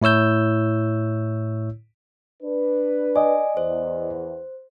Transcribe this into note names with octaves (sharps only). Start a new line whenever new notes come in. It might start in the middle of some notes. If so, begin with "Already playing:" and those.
A2 E4 C#5 E6 G6
D4 B4
D5 D#5 G#5
E2 C5